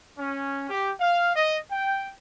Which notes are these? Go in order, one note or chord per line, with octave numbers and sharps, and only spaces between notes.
C#4
G4
F5
D#5
G5